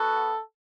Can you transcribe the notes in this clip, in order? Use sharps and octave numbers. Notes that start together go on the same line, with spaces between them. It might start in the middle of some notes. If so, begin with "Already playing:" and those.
Already playing: B3 F#4 A4